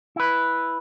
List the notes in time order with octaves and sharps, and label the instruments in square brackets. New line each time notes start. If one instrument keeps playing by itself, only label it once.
[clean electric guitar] E4 B4